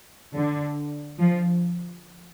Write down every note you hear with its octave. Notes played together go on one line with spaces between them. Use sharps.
D3
F3